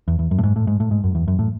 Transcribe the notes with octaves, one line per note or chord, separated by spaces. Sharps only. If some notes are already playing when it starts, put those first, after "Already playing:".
E2
E2
F#2
A2
G#2
A2
G#2
A2
G#2
F#2
E2
F#2
A2